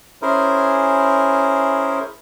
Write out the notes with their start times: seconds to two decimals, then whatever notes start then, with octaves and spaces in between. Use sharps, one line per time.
0.22 C#4 E4 G#4 A#4 C5